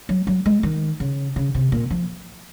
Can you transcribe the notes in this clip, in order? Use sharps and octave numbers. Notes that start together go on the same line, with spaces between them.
F#3
F#3
G#3
D#3
C#3
C#3
C3
A#2
F3